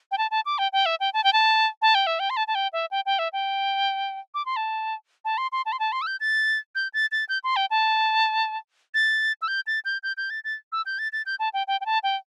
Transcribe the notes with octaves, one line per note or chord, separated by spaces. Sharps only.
G5
A5
A5
D6
G5
G5
E5
G5
A5
G5
A5
A5
G5
E5
G5
C6
A5
A5
G5
E5
G5
G5
E5
G5
D6
C6
A5
A5
C6
C6
A5
C6
A5
C6
E6
G6
A6
G6
A6
A6
G6
C6
G5
A5
A6
E6
G6
A6
G6
G6
G6
A6
A6
E6
G6
A6
A6
G6
A5
G5
G5
G5
A5
G5